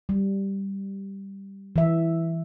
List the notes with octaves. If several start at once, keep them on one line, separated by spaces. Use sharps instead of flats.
G3
E3 E5